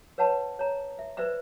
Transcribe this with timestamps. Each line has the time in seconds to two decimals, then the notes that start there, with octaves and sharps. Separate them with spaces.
0.18 B4 C#5 F#5 A5 B5
0.59 C#5 A#5
0.99 E5
1.17 B4 C5 D5 E5 B5